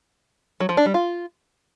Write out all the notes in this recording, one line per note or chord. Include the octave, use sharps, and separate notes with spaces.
F#3
F3
D4
G3
F4